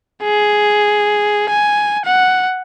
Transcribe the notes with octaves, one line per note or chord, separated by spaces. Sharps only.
G#4
G#5
F#5